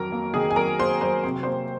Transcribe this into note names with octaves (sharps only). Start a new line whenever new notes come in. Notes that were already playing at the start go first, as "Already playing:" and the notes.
Already playing: F2 D#3 F#3 A#4 A#5
A#3
D#3 G#4 G#5
G#5
F#3 A#4 A#5
A#3 C5 C6
F#3 C5 C6
C3 C6
A#3 C5 C6